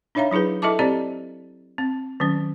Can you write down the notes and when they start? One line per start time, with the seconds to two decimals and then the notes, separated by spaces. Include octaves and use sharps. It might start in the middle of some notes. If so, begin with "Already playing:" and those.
0.15 D4 D#4 C#5 E5 F5 A#5
0.31 F#3 D#4 E4 G#4 B4
0.62 E4 A4 D#5 E5 A5 D6
0.79 C4 G4 C5 D5 D#5 A#5
1.78 C4
2.20 D#3 F#3 C#4